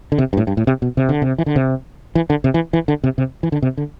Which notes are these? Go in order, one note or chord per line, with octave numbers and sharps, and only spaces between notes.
D3
C3
G2
A2
G2
A2
C3
B2
C3
D3
C3
E3
D3
C3
E3
D3
C3
E3
E3
D3
C3
C3
E3
D3
C3
D3